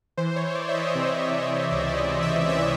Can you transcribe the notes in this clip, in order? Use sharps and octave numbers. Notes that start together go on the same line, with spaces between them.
E3 C5
C#5
E3 D5
E5
D#5
D#5
C3 D5
C5
C3 C5
C#5
C#5
C#2 D5
D5
D#5
E3
E5
E3 E5